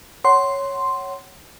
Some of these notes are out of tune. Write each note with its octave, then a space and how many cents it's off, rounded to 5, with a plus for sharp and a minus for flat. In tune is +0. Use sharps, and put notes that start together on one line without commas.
C#5 +0 F#5 +25 C6 +0